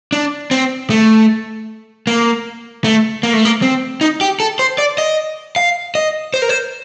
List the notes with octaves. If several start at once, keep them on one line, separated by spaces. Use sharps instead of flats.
D4
C4
A3
A#3
A3
A#3
A3
A#3
C4
D#4
G4
A4
C5
D5
D#5
F5
D#5
C5
A#4
C5